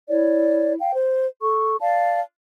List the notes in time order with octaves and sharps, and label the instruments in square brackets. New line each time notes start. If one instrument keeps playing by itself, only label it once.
[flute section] E4 C#5 D5
F5 G5
C5
A4 C#6
D5 F5 A5